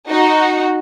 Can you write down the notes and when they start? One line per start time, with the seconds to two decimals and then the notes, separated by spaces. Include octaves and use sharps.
0.09 D#4 F#4